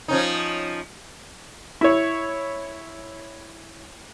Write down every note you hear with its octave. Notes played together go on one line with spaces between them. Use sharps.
F3 C#4 D#4
E4 C#5